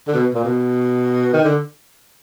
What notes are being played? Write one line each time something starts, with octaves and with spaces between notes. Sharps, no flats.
D3
B2
A#2
B2
D#3
D3